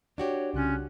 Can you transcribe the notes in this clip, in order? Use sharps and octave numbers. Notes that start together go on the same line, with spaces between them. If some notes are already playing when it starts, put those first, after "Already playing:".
D4 F#4 G4 C#5
C2 C#3 C#4 F4 F#6